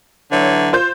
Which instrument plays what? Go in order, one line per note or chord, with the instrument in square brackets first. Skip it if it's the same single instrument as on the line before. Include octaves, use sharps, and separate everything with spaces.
[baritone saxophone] D3 [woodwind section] E3 F#3 C#5
[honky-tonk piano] F4 C5 G6